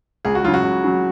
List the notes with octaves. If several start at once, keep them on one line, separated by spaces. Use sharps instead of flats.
C#2 G#4
F#4
C#3 F#3 F4
F#4
C#2
C#3 F#3